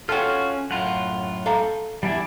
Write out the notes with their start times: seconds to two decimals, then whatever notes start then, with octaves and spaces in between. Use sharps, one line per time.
0.09 C#4 F4 F#4 A4 G5 F6
0.71 F#2 A2 F4 F#5
1.46 A4 F5 A#5
2.03 E2 G3 D4 E4